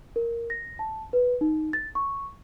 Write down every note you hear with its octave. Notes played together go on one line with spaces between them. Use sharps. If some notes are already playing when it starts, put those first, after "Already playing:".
A#4
A#6
A5
B4
D#4
A6
C#6